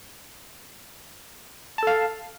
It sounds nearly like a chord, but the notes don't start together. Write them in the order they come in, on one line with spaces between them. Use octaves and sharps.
A5 A4 F5